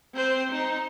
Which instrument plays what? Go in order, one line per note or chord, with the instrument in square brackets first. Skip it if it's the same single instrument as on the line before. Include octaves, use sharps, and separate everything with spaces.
[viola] C4 C5
D#4